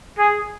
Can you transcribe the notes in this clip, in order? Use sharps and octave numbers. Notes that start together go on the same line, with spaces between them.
G#4